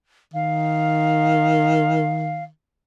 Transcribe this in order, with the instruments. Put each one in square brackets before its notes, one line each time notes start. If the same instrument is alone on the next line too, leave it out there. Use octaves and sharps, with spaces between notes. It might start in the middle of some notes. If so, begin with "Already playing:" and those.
[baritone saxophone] D#3 [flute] F5